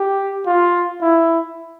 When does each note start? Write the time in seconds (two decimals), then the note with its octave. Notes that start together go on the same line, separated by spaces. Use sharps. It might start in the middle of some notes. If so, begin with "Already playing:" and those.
Already playing: G4
0.46 F4
1.01 E4